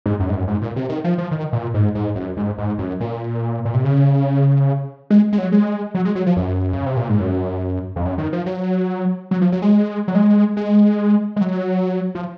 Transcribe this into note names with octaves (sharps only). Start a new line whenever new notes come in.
G#2
F#2
G#2
F#2
G#2
A#2
C3
D#3
F3
F3
D#3
A#2
G#2
G#2
F#2
G#2
G#2
F#2
A#2
A#2
C3
C#3
G#3
G#3
F#3
G#3
F#3
G#3
F#3
F3
F#2
C#3
C3
A#2
G#2
F#2
F2
F#2
D#3
F3
F#3
F#3
F3
F#3
G#3
F#3
G#3
G#3
G#3
F#3
F3